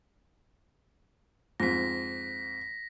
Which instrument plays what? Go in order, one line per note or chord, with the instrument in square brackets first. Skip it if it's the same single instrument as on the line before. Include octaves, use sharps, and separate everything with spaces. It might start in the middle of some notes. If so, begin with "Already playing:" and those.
[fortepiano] F2 G#2 [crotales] A#6 B6